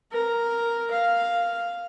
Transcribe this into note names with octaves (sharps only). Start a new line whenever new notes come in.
A#4
F5